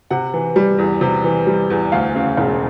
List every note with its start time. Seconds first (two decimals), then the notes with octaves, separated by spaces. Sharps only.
0.10 C3 F#5
0.34 E3
0.56 G3
0.78 E2
1.01 C3
1.24 E3
1.47 G3
1.70 E2
1.92 D2 F5
2.15 C#3
2.37 E1